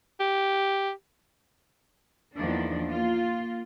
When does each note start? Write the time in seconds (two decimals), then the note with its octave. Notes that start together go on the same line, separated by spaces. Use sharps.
0.20 G4
2.37 E2 D#3 F3 A#3 D4
2.92 A#3 F4